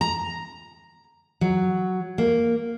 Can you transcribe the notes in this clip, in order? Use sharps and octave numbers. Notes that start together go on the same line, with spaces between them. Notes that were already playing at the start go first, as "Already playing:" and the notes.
A#5
F#3
A#3